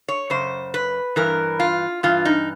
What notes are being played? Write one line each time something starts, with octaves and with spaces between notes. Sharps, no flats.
C#5
F#2 C#3 C5
B4
G2 E3 A#4
F4
G2 E3 F4
D#4